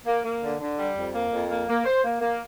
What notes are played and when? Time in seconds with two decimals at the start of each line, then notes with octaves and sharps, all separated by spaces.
0.06 A#3
0.24 A#3
0.43 D3
0.60 D3
0.78 G3
0.96 F2
1.14 A#3
1.32 F2
1.50 A#3
1.68 A#3
1.85 C5
2.04 A#3
2.21 A#3